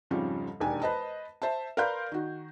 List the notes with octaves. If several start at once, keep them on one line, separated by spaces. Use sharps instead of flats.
F2 G#2 C#3 F3 G3
E1 D#2 D4 G4 G#5
B4 C5 D#5 A5
C5 E5 A5
A#4 B4 D5 F5 C6 G6
D#3 F#4